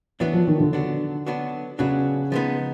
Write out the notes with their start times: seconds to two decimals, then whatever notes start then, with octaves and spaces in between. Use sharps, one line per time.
0.20 E3 F#3 B3 D4 F#4
0.33 F3
0.47 D#3
0.60 D3
0.73 F#3 B3 D4 F#4
1.27 F#3 B3 D4 F#4
1.79 C#3 F#3 B3 D4 F#4
2.32 F3 G#3 B3 D#4